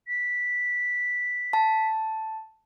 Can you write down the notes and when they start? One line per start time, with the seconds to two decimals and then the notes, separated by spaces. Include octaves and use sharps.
0.08 B6
1.53 A5